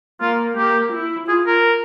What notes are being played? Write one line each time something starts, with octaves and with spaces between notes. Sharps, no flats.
A#3 F4
A#3 G4
E4
F4 G#4
A#4